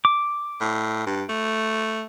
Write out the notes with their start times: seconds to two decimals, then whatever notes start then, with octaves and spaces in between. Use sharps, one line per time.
0.05 D6
0.61 A2
1.06 G2
1.29 A3